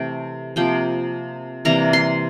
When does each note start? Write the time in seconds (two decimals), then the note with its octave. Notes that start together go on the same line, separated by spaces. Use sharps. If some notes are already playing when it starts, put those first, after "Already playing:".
Already playing: C3 E3 A3 G5
0.56 C3 F3 A#3 G5
1.65 C3 E3 G3 A#3 A#5
1.93 C6